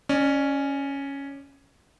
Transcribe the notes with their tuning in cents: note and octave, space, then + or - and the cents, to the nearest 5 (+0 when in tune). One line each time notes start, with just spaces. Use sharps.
C#4 +0 D5 +35